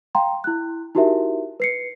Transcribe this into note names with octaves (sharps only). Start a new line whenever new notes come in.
F5 G5 A#5 C6
E4 F#6
D#4 E4 F#4 G4 A#4 E5
B4 C7 C#7